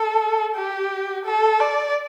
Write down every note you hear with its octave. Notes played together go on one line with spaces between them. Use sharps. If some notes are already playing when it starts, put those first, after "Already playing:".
Already playing: A4
G4
A4
D5